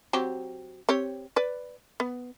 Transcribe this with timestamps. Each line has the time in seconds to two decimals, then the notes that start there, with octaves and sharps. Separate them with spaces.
0.13 F#3 C4 G4
0.89 C4 G4 C#5
1.36 B4 D5
2.00 B3